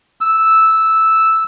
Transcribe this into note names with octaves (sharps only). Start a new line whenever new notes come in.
E6